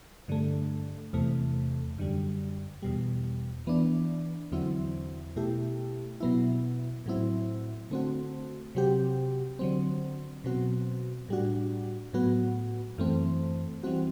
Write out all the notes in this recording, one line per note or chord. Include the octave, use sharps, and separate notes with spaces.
G2 D3 A3
E2 C3 E3 A3
F#2 D3 G3
E2 B2 G3
E3 B3 D4
E2 D3 F#3 C4 E4
B2 A3 E4 G4
B2 F#3 B3 E4
A2 F#3 C4 E4
D3 A3 C4 F#4
C3 F#3 C4 G4
D3 F#3 C4
B2 F#3 C4 F#4
A2 G3 D4 F#4
A2 F#3 B3 F#4
F#2 E3 A3 C4
E3 G3 C4 F#4